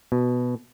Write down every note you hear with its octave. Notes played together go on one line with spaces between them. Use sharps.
B2